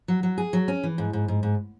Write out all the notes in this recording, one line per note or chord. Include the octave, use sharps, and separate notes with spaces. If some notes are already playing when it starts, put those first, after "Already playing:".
F#3
F#3
G#4
F#3
C#4
E3
G#2
G#2
G#2
G#2